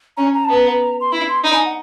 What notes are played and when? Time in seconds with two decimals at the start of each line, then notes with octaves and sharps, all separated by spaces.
0.17 C#4 A#5
0.33 A#5
0.45 B3 A5
0.55 A#5
1.01 C6
1.12 E4 B5
1.29 C6
1.44 D#4 B5
1.54 G#5
1.66 F#5